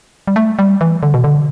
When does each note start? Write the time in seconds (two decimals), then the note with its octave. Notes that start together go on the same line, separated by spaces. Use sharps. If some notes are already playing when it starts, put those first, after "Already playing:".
0.27 G3
0.36 A3
0.59 G3
0.81 E3
1.03 D3
1.14 B2
1.24 D3